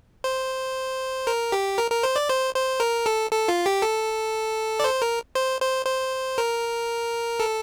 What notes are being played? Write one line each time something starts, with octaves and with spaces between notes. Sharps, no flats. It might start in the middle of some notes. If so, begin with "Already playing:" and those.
C5
A#4
G4
A#4
A#4
C5
D5
C5
C5
A#4
A4
A4
F4
G4
A4
D5
C5
A#4
C5
C5
C5
A#4
A4